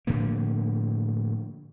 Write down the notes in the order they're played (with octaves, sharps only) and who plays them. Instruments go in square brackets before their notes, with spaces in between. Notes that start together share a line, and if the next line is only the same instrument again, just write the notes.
[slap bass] A2 D3 F3 A#3